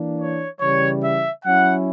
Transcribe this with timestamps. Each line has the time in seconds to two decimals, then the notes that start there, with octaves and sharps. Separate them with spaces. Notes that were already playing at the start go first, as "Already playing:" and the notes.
Already playing: E3 A#3 D4
0.18 C#5
0.60 C#3 E3 G3 C#5
1.01 E5
1.44 F#3 C#4 E4 F#5